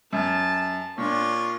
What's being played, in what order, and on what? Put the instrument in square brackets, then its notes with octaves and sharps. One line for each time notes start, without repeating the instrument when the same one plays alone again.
[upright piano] F#2 [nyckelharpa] A5
[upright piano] A#2 [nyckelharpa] D4 [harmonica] F4 C#5